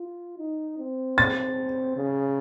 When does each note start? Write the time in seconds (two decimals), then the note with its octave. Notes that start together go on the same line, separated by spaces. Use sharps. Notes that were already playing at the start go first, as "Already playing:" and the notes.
Already playing: F4
0.39 D#4
0.78 C4
1.18 A6
1.96 C#3